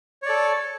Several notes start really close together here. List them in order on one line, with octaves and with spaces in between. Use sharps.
C#5 D5 A4